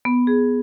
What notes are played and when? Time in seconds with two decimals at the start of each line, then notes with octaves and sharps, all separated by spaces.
0.05 B3
0.27 G#4